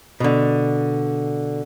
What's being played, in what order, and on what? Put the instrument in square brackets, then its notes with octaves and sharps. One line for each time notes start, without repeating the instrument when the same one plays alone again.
[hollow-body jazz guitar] B2 D3